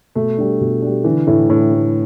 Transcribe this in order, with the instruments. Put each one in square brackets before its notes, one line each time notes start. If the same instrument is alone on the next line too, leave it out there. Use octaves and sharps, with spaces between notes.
[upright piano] B2 [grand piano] A3
[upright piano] G3 D4
B2
G3 D4
[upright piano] D3 [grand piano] E3
[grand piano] A2 [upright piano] A3 E4
[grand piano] A2 [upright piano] D3
[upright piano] A3 E4